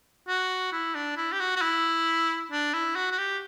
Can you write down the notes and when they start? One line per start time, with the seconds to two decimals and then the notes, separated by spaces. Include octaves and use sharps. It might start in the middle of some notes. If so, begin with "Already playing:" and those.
0.28 F#4
0.72 E4
0.95 D4
1.17 E4
1.32 G4
1.40 F#4
1.56 F#4
1.61 E4
2.52 D4
2.74 E4
2.96 F#4
3.12 F#4
3.18 G4